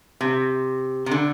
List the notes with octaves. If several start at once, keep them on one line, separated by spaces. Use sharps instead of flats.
C3
C3
D3